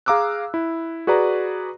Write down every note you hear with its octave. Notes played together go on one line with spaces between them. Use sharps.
G#4 F5 A#5 D6 E6 F#6
E4
F#4 G#4 B4 D5 A#5